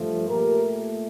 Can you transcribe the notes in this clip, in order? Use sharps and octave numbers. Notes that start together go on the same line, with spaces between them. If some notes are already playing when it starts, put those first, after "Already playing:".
Already playing: G2 F3 A3
A#2 A3 G4 A#4